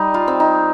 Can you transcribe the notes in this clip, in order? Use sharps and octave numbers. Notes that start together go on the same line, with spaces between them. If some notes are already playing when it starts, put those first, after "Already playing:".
Already playing: G3 D#4
F4
C4
D#4